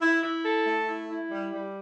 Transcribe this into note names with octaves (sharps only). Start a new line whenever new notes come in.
E4
E4
A4
A3
E4
E4
G3
G3